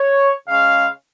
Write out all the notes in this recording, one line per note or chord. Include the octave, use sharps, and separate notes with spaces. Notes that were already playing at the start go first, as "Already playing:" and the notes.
Already playing: C#5
C#3 G#3 C#4 F5